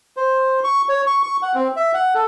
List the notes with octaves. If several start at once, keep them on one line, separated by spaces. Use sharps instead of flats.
C5
C#6
C#5
C#6
C#6
F#5
C4
E5
F#5
A4